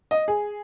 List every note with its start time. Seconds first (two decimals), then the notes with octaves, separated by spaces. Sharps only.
0.11 D#5
0.28 G#4